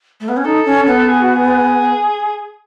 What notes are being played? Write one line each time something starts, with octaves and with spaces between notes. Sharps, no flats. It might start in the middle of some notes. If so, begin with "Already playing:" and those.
A3
B3
C#4
D#4 A4
C#4
B3
G#4
F#4
G#4